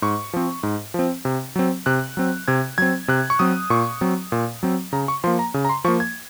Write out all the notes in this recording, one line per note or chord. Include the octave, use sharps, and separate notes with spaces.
G#2 C#6
F3 C4
G#2
F3 C4
C3
F#3 C4
C3 F#6
F#3 C4
C3 G#6
F#3 C4 G#6
C3 F#6
C#6
F#3 C4 D#6
A#2 C#6
F#3 C4
A#2
F#3 C4
C#3 A#5
C#6
F3 A#3 C6
A#5
C#3
A#5
C6
F3 A#3 C#6
G#6